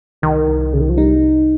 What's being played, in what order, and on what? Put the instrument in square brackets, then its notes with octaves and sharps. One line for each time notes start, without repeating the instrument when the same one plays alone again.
[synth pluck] C2 [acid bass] D#3
[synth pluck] C2
[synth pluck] C2 [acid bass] C#3
[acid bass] D#3
F3
[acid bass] G3 [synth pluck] D#4